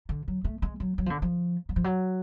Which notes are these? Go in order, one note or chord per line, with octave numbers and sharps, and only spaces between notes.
D3
F#3
A3
G#3
F#3
F#3
F3
D3
F3
F#3
F3
F#3